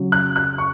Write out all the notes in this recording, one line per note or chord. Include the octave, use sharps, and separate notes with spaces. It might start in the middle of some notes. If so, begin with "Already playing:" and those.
Already playing: C#3 F#3
F#6
F#6
C#6